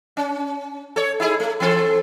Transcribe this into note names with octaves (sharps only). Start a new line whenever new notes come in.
C#4
A4 C#5
D#4 E4 G#4
A3
E3 C4 A4